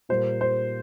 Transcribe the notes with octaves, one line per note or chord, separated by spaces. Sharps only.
A#2 G3 A#3 C5
C5